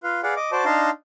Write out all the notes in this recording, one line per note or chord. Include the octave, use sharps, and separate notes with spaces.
F4 B4 F5
G#4 B4 D5 F5 F#5
D#5 D6
F#4 C5 D5 A5 D6
D4 D#4 F5 A5 A#5 C6